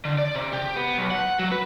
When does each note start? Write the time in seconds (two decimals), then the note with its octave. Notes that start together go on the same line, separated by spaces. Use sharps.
0.05 D3
0.18 D5
0.35 C3
0.53 G4
0.76 B3
0.98 B1
1.11 F#5
1.39 F#3
1.52 B4